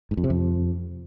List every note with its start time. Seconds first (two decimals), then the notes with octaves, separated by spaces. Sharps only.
0.11 G#2
0.17 F2
0.24 C3
0.30 F2